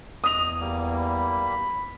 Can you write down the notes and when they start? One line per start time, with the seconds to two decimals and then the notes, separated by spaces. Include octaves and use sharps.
0.24 E2 D#5 D#6 F7
0.60 G3 A#3
0.98 B5